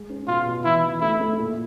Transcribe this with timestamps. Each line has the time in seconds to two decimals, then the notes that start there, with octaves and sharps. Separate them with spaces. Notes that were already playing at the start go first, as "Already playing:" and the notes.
Already playing: G#3
0.09 C#4
0.27 B2 F4
0.46 B2
0.64 E3 E4
0.83 E3
1.01 A3 E4
1.20 A3
1.39 A#2